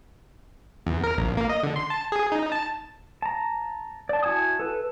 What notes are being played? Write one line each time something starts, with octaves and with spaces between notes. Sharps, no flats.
E2
A#4
A#1
A#3
D#5
D3
C6
A5
G#4
D#4
A5
A5 A#5
D5 A5
E4 F#4 G#5 A5 D#6
A4 B4